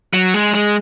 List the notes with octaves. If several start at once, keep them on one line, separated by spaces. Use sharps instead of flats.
F#3
G#3
G#3